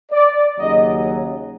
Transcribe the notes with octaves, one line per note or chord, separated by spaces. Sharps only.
D5
D#2 C#3 F#3 D#5